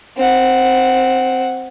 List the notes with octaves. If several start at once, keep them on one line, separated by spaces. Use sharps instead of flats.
C4 F#5